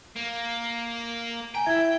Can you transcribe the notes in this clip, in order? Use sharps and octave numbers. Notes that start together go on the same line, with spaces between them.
A#3
G5 G#5 A#5
E4 E5 G#6